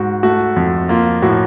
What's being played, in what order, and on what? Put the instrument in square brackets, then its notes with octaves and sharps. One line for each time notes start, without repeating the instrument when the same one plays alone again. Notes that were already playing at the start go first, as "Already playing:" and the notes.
Already playing: [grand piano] G#2 F#4
A3 F#4
F2
A#3 F4
A2 F#4